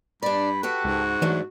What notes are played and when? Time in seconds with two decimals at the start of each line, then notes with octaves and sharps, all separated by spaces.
0.22 G2 D4 D5 B5
0.63 F#4 G4 A4 B4
0.84 C#2 G#2
1.22 E3 F#3 A3 D4